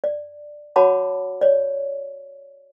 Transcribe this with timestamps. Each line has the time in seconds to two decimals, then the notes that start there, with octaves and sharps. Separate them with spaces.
0.04 D5
0.76 F#4 C#5 F#5 A5 B5 D6
1.41 C#5 D5